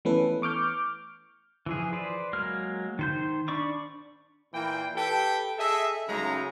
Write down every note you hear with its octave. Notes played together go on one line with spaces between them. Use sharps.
E3 A3 B3 C#4 A4 B4
C#6 D6 F6 G6
E3 F3 G#4
B4 C5 D5
F#3 G#3 A#3 A#4 F6
D#3 C5 G6
D4 D5 B5 C#6 D6
A#2 E3 A#3 G5
G4 A4 B4 G5
G#4 A4 D#5 E5
F#2 C#3 G#3 A3 D#4 A#5